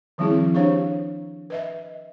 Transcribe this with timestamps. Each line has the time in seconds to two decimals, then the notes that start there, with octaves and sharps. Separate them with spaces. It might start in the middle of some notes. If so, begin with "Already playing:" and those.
0.18 D#3 F3 G3 C4 E4 G#4
0.54 D4 G4 C5 C#5 F5 C#6
1.50 B4 D#5 E5